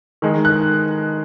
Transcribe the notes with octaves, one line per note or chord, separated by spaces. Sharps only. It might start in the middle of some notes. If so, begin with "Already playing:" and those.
D#3 G#3 D#4
F#6